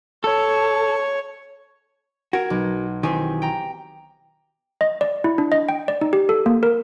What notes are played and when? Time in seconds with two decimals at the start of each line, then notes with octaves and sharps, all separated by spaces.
0.24 A4 C#5
2.33 F#4 A#4 G#6
2.50 B1
3.03 D#3 E3 C4 G4 G#5
3.42 G5 A#5
4.81 D#5
5.01 D5
5.24 E4
5.38 D4
5.52 D#5
5.69 G5
5.88 D5
6.01 D#4
6.13 G4
6.29 A4
6.46 A#3
6.63 A#4